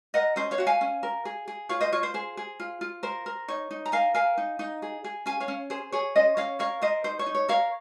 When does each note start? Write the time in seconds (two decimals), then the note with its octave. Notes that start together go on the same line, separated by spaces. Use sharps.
0.14 A#4 D#5 F#5
0.36 C#4 C5 D#5
0.51 C#5 F5
0.58 F#4 F#5
0.67 F5 G#5
0.81 C#4
1.03 A#4
1.25 G#4
1.48 G#4
1.69 F4 C#5 F5
1.81 C5 D#5
1.92 F4 C#5
2.03 C5
2.14 G#4 C5
2.37 G#4
2.60 F4
2.81 F4
3.03 A#4 C5
3.26 A#4
3.48 D#4 C#5
3.71 D#4
3.86 A#5
3.92 A#4 F5 G#5
4.14 A#4 F5 G#5
4.37 D#4
4.59 D#4
4.82 G#4
5.04 G#4
5.26 C#4 F5 G#5
5.40 C#5 F5
5.48 C#4
5.70 G#4 C5
5.92 G#4 C#5
6.16 C#4 C5 D#5
6.37 C#4 C#5 F5
6.59 A#4 C#5 F5
6.82 A#4 C5 D#5
7.04 D#4 C5
7.19 C#5
7.26 D#4
7.35 C#5
7.49 A#4 C#5 F5